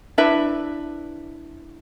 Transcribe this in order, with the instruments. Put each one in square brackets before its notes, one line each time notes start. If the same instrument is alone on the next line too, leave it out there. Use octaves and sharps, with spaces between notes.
[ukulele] D4 E4 B4 E5